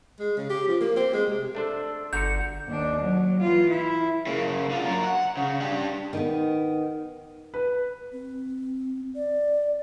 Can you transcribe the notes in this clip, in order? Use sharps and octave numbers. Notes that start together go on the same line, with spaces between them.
G#3
C#3
G4
F3
A#3
C4
G#3
C3
A3 D4 A4 C5
G1 D3 F#4 A#5 G6 C#7
D#2 D4
F#3
E3 F4
E4
C#3 A#3
D3 F4
F#3 A#4
F#5
C#3
D4 G4
D#3 B3
B4
C4
D5